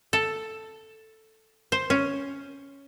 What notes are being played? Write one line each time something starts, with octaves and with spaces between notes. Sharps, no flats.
A4
C5
C#4